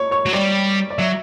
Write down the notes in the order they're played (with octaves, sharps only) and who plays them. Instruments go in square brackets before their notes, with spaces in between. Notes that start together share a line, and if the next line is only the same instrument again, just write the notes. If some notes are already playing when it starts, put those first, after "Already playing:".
Already playing: [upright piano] C#5 C#6
C#5 C#6
[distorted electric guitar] F#3
[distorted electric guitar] G3 [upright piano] D5
[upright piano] D5
[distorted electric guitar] F#3 [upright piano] E5